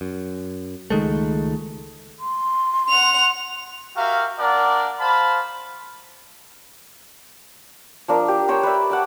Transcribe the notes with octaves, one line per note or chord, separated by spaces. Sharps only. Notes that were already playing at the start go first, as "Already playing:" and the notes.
F#2
C#2 D#3 G#3 A3
C6
F#5 F7
F#4 G4 A#4 E5 F5
A#3 D4 A#4 D5 F#5
C5 F5 A5 B5
F3 D4 A#4
G4
A#4 C5 C#5 G5
B4 D5 E5
F#5 A5 D6